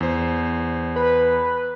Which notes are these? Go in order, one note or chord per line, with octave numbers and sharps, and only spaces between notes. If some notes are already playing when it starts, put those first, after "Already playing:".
E2 C5
B4